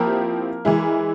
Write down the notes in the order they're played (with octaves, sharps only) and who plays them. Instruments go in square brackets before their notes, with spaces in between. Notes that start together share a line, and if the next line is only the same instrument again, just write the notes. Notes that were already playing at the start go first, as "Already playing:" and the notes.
Already playing: [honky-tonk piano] F3 C4 E4 G4 [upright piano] A#3 A#4
[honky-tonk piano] E3 G#3 E4